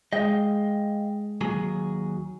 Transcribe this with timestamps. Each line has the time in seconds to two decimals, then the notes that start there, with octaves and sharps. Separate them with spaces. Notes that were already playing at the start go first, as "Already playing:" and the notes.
0.13 G#3 D#5 F5 G5
1.41 D#2 F#3 G#4